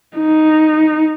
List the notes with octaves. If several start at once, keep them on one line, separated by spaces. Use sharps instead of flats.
D#4